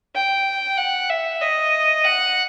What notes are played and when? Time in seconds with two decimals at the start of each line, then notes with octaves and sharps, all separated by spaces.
0.15 G5
0.77 F#5
1.09 E5
1.42 D#5
2.05 F#5